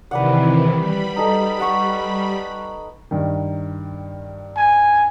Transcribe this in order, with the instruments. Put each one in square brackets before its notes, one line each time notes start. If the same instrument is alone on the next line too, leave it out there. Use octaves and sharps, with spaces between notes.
[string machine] C3 D#3 E3 [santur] B4 D5 F#5
[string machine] G3 B5
[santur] D#4 A4
F#5 C#6
[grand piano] G2 D#3
[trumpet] G#5